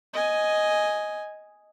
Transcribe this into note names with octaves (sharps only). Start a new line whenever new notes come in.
D#5 G#5